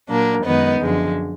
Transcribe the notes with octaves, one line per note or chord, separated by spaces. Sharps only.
A#2 F#3 A#3 D4
F#2 D#3 G#3 B3 D#4
F#2 D3 F3 G#3